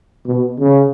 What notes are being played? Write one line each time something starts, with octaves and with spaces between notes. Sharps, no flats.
B2
C#3